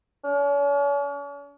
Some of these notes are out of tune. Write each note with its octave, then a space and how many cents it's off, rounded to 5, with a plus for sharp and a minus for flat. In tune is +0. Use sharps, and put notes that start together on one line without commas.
C#4 +45